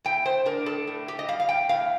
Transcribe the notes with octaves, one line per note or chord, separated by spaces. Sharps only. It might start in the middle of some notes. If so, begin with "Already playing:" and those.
A2 G5
C5
D4 A#4
A4
A2
G4
D#5
G3 F5
F5
G5
A2 F5